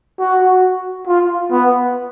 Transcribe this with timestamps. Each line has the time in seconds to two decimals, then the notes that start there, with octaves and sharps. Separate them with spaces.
0.19 F#4
1.07 F4
1.51 B3